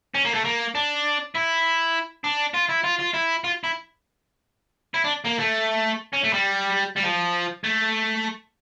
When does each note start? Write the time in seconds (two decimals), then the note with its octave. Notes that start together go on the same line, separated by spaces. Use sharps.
0.15 C#4
0.25 A#3
0.34 A3
0.45 A#3
0.75 D4
1.35 E4
2.24 D4
2.54 F4
2.69 E4
2.84 F4
2.99 F4
3.14 E4
3.44 F4
3.64 E4
4.94 E4
5.04 D4
5.25 A#3
5.39 A3
6.13 C#4
6.24 A3
6.34 G3
6.96 G3
7.04 F3
7.64 A3